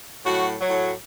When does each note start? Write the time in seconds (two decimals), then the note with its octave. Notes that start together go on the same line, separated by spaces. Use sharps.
0.24 A2 F#3 F#4
0.61 F#3
0.66 A2